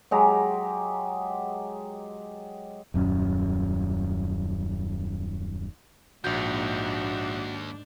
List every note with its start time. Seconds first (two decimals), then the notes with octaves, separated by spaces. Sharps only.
0.11 F#3 G#3 G4 A#5
2.94 D#1 F#2 C#4
6.24 A#1 D#2 G#2 D4 F#4 G6